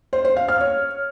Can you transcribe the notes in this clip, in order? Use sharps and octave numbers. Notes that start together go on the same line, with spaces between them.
C5
C5
F5
F6
C#5